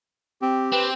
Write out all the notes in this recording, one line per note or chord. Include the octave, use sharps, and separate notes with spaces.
C4 G4
C4 B4